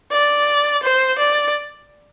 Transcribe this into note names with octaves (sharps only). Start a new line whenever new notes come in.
D5
C5
D5